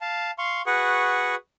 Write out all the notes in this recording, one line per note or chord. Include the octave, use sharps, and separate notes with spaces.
F5 A5
F5 C6 C#6
F#4 G#4 B4 F#5 C#6